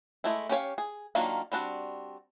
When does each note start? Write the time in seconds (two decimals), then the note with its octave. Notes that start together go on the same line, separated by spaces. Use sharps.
0.24 G#3 A3 E4
0.49 C#4 G4 C#5 F5
0.78 G#4
1.15 D#3 F#3 A#3 D4 F4
1.52 G3 C4 D4 F#4